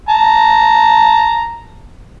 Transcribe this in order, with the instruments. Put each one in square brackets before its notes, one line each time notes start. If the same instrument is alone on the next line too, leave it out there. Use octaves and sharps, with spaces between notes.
[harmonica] A5 A#5